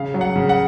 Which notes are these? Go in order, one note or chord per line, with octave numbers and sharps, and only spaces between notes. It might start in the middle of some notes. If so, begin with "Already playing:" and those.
Already playing: C#3 F5
F#3
F#5
C#3
F#5